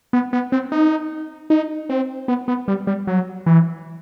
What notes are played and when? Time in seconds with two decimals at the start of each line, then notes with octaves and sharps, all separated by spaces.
0.13 B3
0.33 B3
0.52 C4
0.72 D#4
1.50 D#4
1.89 C4
2.28 B3
2.48 B3
2.68 G3
2.87 G3
3.07 F#3
3.46 E3